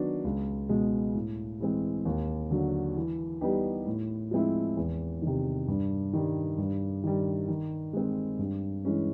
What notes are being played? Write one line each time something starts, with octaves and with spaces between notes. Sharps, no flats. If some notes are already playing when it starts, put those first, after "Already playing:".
Already playing: D#3 F#3 B3 D4 F#4
C#2
B2 G#3
A2
E3 G#3 C4
D#2
D3 F#3
E3
G3 B3 D#4 G4
A2
F3 G#3 C4 E4
E2
C3 D#3
G2
D#3 G3
G2
D#3 G3
D#3
G#3 C4
G2
E3 G#3 C#4